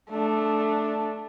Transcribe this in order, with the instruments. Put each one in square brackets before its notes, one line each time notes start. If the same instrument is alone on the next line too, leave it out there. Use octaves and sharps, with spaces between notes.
[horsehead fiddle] A3 D4